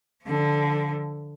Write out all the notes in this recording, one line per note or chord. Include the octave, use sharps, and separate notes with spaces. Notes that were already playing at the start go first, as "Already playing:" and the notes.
D3 F3